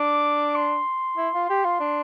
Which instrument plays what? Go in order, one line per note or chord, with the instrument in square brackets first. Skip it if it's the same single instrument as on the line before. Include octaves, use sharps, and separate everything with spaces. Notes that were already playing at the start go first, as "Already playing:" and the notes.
Already playing: [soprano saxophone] D4 [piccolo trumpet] D6
[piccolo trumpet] C6
[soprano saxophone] E4
F4
G4
F4
D4